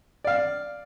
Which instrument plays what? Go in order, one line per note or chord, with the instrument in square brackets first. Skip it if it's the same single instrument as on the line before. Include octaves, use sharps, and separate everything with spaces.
[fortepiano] D5 F5